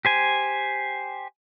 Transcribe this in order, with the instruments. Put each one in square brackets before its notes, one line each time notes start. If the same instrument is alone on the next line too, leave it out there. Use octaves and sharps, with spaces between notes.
[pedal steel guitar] G4 C5 G#5